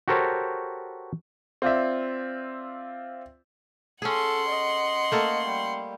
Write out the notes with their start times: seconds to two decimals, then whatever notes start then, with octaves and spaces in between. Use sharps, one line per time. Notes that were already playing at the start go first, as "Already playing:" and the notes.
0.08 F#4 G4 A4 A#4 C5 C#5
1.62 C4 F4 D5 E5
4.02 C#4 G#4 A4 F#5 C6
4.48 D#5
5.12 A3 A#3 A4
5.45 G3